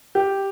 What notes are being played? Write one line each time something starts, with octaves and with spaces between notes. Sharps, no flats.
G4